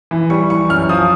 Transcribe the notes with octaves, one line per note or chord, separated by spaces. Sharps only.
E3
G3 C#6
E3 C#6
F#2 F6
F3 D#6